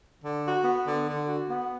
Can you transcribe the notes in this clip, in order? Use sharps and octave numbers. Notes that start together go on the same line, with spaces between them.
D3
F#4
B3
D3
D3
F#4
B3